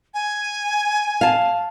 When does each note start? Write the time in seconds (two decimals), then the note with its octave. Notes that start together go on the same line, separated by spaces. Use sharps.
0.14 G#5
1.21 F5 A5